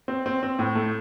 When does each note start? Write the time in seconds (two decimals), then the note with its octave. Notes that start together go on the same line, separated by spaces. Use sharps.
0.08 C4
0.26 C4
0.43 C4
0.59 A2
0.75 A3